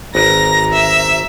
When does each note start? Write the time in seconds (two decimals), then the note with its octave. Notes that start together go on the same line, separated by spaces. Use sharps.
0.15 G#1 A#4 B4 A#5 A#6
0.73 E5